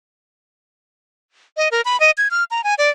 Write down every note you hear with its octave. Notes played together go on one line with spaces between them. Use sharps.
D#5
A#4
B5
D#5
G#6
F6
A#5
G#5
D5